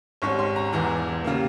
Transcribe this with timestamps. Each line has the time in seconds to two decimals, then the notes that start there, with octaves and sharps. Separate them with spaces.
0.22 G#1 G#2 G3 C#4 C#6
0.39 C6
0.56 A#5
0.73 E1 E2 E3 A#5
1.24 C#3 G3 A#3